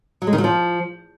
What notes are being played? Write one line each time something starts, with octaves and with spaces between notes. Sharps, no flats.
F#3
G#3
D#3
F#3
F3